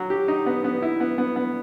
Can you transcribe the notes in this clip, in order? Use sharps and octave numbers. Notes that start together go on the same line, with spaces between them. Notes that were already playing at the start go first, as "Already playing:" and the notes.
Already playing: F#3
G4
D#4
B3
B3
E4
B3
B3
B3